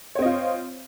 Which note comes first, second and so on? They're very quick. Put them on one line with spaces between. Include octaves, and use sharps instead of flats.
C#5 C4 D#5 F4